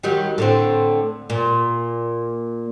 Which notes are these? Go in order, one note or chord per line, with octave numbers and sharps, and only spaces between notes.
D#3 F#3 G3
A2 D3 C4
A#2